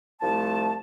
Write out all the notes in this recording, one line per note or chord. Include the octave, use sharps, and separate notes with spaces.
C2 F3 A3 A5